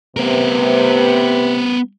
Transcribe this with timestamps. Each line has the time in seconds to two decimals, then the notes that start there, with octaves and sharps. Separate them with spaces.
0.17 C3 B3 A#4 B4